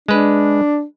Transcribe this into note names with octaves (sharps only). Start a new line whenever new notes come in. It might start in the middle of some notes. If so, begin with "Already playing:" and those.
G#3 D4 B4